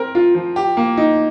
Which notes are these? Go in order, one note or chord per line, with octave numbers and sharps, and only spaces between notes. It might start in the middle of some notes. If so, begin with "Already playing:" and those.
Already playing: C4 A#4
F4
F3
G4
A#3
D#4